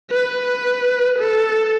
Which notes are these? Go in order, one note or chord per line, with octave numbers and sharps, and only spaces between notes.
B4
A4